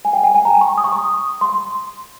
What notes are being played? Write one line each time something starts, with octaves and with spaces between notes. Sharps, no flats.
G#5
G5
G5
G#5
A#5
C#6
D#6
C#6
D#6
C6